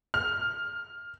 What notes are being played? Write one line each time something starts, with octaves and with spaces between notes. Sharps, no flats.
F6